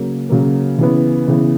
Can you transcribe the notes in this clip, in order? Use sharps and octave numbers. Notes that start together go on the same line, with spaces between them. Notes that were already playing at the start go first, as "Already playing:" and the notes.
Already playing: C#3 F#3 A#3
C#3 F#3 A#3
C#3 E3 B3
C#3 E3 B3